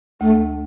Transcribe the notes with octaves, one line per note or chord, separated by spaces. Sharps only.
D2 A3